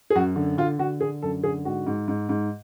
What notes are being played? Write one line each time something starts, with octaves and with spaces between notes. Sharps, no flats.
G#4
F#2 F#4
D3
D3 F4
D3 F#4
D3 G#4
F#2 A4
D3 G#4
G#2 F#4
G#2
G#2
G#2